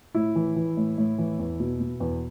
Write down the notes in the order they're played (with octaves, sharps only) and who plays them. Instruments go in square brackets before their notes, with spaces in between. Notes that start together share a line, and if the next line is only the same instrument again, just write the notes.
[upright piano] A2 E4
E3
E3
A2
A2
E3
E2
B2
B2
E2